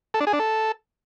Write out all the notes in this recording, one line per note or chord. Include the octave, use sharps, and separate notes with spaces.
A4
D4
G#4
D4
A4